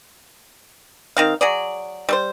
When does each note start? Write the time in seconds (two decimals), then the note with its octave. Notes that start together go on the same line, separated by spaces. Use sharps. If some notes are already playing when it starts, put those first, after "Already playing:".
1.17 D#3 C4 F5
1.41 F#3 G#4 D5
2.09 G3 A4 C5